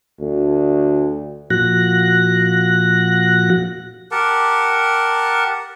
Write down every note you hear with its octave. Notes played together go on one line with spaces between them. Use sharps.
D2
A#2 F3 F#4 F#6 A#6
G4 A#4 F#5 A5